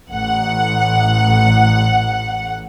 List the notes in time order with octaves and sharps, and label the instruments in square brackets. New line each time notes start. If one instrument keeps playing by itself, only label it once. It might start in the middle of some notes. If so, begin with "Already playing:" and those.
[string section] A1 F#5